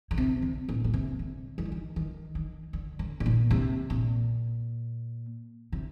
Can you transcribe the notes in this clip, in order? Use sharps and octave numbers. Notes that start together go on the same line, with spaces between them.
D3
C3
D3
A#2
A#2
C3
D3
D#3
D3
D#3
D#3
D#3
D3
D3
A2
A#2
C3
A#2
C3